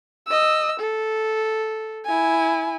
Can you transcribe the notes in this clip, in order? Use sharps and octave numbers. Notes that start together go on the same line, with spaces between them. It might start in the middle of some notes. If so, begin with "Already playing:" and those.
D#5 E6
A4
E4 G#5